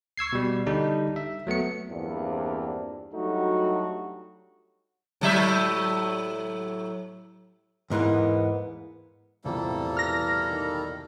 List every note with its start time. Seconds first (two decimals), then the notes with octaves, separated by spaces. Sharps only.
0.18 C#6 E6 G#6 C7
0.33 B2 G3
0.66 D3 G3 D4 D#4
1.16 E5
1.47 F#3 A3 B3 C#7
1.89 E2 G2 F3 A#3 C4 D4
3.14 F#3 G3 A3 D4 D#4 F#4
5.21 A2 F#3 E5
7.90 E2 G#2 E3 A#3 B3
9.45 E1 C2 A2 F3 G3 A#3 A4
9.97 E3 F6 A#6
10.49 D#3